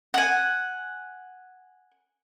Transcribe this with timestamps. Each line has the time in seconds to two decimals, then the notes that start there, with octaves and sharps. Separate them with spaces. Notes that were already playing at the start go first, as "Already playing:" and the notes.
0.14 F#5 G#5